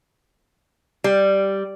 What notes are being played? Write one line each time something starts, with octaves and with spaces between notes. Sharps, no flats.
G3